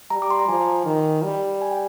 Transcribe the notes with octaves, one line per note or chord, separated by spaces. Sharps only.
G3 A#5
D6
C6
A#5
F3 G#5
D#3
G3
G#5
G5